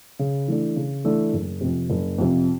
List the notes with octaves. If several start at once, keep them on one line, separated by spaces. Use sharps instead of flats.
C#3
E3 A3 D4
C#3
E3 A3 D4
F#1
F2 C3
F#1
F2 C3